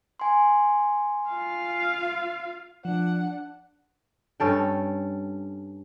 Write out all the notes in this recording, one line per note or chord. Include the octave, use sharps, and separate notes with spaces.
G#5 C6
F4 F5
F3 D4 F#5
G2 C#4 A4 G5